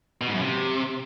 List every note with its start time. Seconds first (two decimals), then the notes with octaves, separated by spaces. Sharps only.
0.21 B2
0.28 G#2
0.34 F#2
0.40 C3